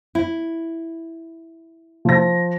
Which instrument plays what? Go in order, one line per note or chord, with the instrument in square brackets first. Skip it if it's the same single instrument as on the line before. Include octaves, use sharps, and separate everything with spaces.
[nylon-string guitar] E4
[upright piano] F3 A#6